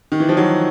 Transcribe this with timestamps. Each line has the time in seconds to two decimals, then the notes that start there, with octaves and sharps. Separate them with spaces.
0.12 D#3
0.20 E3
0.29 F3
0.37 E3 F#3